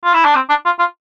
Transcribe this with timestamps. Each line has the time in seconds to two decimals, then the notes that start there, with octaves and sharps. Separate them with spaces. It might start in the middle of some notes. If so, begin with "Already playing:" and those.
0.04 F4
0.14 E4
0.25 D4
0.35 C4
0.49 D4
0.65 F4
0.79 F4